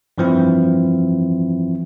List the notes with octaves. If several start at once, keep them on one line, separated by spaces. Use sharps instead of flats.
G2 E3 F3 C4 E4